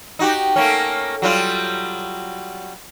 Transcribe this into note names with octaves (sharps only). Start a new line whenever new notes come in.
D#4 F#4 G4
A3 A#3 C#4
F#3 G3 F4